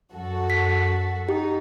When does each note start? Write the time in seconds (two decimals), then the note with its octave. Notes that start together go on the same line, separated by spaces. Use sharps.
0.12 F#2 F#4 A4
0.50 B6
1.29 D#4 G4